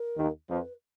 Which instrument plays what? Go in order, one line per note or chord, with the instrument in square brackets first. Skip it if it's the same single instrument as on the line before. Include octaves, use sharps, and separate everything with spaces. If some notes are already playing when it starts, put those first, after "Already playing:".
Already playing: [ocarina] A#4
[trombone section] D#2 D#3
[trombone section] F2 F3 [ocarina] B4